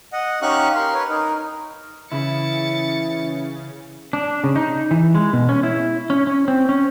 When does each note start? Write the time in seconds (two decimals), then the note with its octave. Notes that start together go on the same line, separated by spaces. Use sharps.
0.13 D#5 F#5
0.42 C#4 D#4 G4 F5 C#6 F#6
0.75 A#4 C6
0.94 B4 C#5
1.09 D#4 A#4
2.12 C#3 E3 E4 A6 C#7
4.13 D4
4.44 C#3
4.56 D#4
4.91 E3
5.15 G#3
5.33 B2
5.49 C#4
5.63 E4
6.10 C#4
6.27 C#4
6.48 C4
6.69 C#4